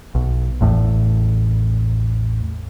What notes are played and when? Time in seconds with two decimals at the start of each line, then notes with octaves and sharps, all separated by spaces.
0.15 B1
0.61 A1 E2 A2